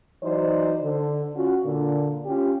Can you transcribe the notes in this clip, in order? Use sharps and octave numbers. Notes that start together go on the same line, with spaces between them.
E3 F#3 D#4 C5 D5
D3
C#4 F4 F#4
A#2 D3
C#4 F4 G4